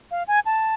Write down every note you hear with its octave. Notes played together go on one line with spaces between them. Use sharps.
F5
G#5
A5